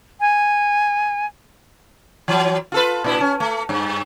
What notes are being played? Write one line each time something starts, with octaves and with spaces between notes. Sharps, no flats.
G#5
E3 F#3
F4 A4 B4
A#2 D4 E4
C#4
A3
G2